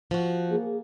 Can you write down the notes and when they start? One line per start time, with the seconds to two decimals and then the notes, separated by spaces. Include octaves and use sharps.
0.11 F3 F#4
0.51 A#3 G#4